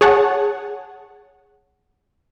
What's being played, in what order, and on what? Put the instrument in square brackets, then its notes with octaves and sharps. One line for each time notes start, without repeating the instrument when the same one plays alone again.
[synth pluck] G#4 C#5 F#5 A5